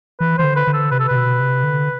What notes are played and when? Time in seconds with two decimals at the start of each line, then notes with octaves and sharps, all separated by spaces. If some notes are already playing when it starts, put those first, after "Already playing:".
0.20 E3 B4
0.38 E3 C5
0.44 D3
0.56 B4
0.67 D3
0.74 A4
0.91 C3 B4
1.00 A4
1.08 C3 B4
1.16 B2
1.40 C3
1.64 D3